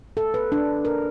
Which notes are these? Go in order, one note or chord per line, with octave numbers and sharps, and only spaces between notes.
A4
B4
D4
A#4